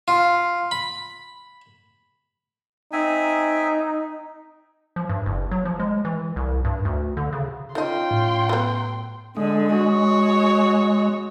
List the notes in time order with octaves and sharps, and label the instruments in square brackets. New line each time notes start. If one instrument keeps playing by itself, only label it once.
[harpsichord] F4
B5
[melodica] C4 E5 G#5 [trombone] D#4
[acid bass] F3
G2
F#1
F#3
F3
G#3
E3
C2
G2
D2
D3
C#3
[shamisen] D#3 D#5 [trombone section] C#4 F4 [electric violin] G5 C6 [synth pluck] G6
[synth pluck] A2
[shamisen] F#3 B3
[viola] D3 [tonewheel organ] G#3
[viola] F#4 C#5